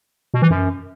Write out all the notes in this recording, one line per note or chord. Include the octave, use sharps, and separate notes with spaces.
B2
E3
F#2